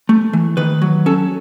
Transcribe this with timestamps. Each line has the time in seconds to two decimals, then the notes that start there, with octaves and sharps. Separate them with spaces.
0.09 A3
0.33 E3
0.57 D#3 B4
0.82 F#3
1.06 C#4 A4